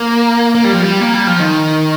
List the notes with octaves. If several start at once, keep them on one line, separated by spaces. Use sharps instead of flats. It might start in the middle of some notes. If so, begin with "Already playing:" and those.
Already playing: A#3
A#3
G3
F3
G3
A#3
G3
F3
D#3